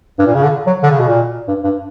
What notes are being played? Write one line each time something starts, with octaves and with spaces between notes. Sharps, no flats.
G2
A#2
C#3
D3
F#3
D3
C#3
B2
A#2
G2
G2